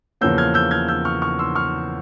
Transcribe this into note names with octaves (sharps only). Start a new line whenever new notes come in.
E2 C#3 F3 A#3 C#4 E6 G6
F6 G#6
E6 G6
F6 G#6
E6 G6
C#6 F6
C#6 F6
C6 E6
C#6 F6